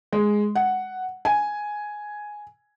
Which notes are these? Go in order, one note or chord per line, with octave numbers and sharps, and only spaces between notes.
G#3
F#5
G#5